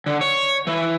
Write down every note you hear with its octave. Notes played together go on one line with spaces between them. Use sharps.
D3
C#5
E3